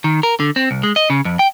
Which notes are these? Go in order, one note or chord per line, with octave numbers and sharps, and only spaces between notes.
D#3
A#4
D3
C4
C2
G#3
D#5
C#3
F2
G5